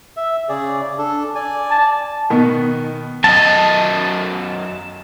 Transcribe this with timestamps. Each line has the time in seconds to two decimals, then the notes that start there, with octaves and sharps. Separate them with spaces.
0.17 E5
0.49 C#3 G#4 D5
0.98 D4 A4
1.35 D5 G#5
1.70 A5
2.30 B2 D#3 B3
3.24 F#2 D#5 A5